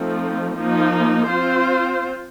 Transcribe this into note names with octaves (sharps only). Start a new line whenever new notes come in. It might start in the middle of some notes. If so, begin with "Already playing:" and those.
Already playing: F3 A3 C4 D#4
F3 A#3 D#4
C4 F4 C5